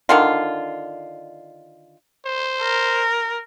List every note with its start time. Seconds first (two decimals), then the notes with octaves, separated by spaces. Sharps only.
0.09 D3 D#3 F4
2.26 C5
2.63 A#4